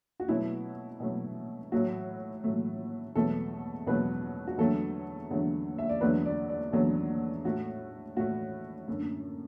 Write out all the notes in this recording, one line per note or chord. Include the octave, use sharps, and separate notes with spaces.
F#4
B2 F#3 A3 E4
B2 F#3 A3
A2 F#3 A3 F#4
A2 F#3 A3
E2 B2 F#3 A3 A4
E2 B2 F#3 A3 B4
F#4
E2 D3 F#3 A3 A4
E2 D3 F#3 A3
E5
D5
E2 D3 F#3 A3 B4
D5
D5
E2 D3 F#3 A3 A4
A2 A3 F#4
A2 A3 F#4
F#2 D3 A3